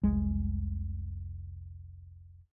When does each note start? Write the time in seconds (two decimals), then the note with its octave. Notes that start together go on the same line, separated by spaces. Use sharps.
0.03 F1 C2 G#3